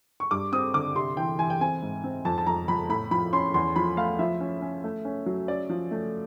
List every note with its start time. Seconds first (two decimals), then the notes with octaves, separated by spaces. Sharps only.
0.20 C#6
0.31 G2 D6
0.52 C4 D#6
0.74 D3 D6
0.96 C3 C6
1.17 E3 G5
1.39 E3 G#5
1.50 G5
1.60 C4 G#5
1.82 G#2
2.04 C4
2.25 F2 A5
2.38 A5
2.46 F2 A#5
2.68 F2 B5
2.89 A2 B5
3.11 F3 B5
3.33 C#4 C6
3.54 E2 C6
3.76 F3 B5
3.97 A3 F5
4.19 F3 E5
4.40 C#4
4.62 C#4
4.84 A3
5.05 C#4
5.26 F#3
5.48 C#4 D5
5.70 F3
5.91 A3